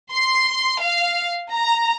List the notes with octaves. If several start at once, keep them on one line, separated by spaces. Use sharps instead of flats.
C6
F5
A#5